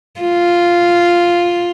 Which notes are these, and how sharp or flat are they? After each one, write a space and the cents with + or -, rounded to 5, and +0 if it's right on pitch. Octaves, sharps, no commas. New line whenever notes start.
F4 -5